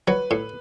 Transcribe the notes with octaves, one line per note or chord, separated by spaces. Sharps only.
F#3 B4
A2